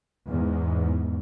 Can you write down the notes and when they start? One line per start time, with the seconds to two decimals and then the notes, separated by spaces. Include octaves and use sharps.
0.28 E2 G#2